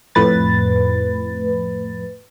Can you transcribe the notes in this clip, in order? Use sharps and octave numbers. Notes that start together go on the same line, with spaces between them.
F2 A2 B4 A6